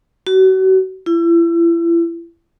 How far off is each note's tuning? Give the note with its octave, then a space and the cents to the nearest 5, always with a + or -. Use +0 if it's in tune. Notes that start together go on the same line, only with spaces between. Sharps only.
F#4 +35
E4 +35